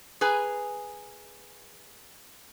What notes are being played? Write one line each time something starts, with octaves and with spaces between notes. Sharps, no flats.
G#4 B4 G#5 A#5